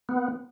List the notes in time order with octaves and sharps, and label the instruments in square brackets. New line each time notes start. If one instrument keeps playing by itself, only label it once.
[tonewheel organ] B3